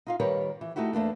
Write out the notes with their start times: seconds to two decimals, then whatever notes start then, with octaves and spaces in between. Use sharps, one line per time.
0.07 D#4 F4 F5
0.20 D#3 G3 G4 A#4 B4 C#5
0.61 E3
0.76 A3 D#4 E4 F#4 G4
0.93 E2 A3 A#3 D4